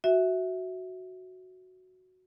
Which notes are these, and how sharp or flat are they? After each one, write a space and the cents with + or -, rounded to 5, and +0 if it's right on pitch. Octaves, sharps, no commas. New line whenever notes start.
F#4 +0 E5 -10